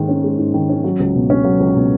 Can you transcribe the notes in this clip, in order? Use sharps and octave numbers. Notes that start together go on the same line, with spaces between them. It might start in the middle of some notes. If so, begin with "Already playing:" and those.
Already playing: G#2 D#3 G#3
C#4
G#3
G#2
D#3
C#4
F#3
C#2
B2
C#4
F#3
C#2
B2